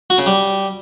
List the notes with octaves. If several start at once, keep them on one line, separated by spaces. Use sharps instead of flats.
F#4
C#3
G3